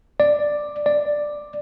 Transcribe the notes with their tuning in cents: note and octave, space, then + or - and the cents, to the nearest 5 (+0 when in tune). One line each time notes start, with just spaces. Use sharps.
D5 +5
D5 +5